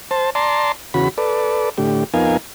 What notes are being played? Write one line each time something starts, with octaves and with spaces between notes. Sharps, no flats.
C5 A5
D5 A5 A#5 C6
E2 C#3 F#4 B5
A4 B4 D5
A2 D3 G4
F2 B3 D#4 A#4 F5 G#5